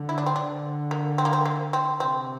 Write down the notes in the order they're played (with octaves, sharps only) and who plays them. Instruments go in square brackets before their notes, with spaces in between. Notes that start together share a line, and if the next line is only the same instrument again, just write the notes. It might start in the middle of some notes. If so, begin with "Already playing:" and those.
Already playing: [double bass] D3
[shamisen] E4
D4
C4
[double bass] D3 [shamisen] D4
[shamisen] A#3
C4
A#3
C4
A#3
C4
[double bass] C3 [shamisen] C4